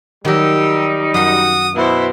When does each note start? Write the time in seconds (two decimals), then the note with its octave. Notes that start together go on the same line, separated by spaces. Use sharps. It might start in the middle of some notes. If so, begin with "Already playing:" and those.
0.25 D#3 F#3 G3 D#4 G4 E6
1.14 F#2 F#4 C6 D#6
1.74 B2 E4 C5